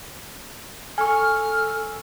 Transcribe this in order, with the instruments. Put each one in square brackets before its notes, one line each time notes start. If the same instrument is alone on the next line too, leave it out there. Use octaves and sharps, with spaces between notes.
[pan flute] A4 [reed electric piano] G#5 C#6 [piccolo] F6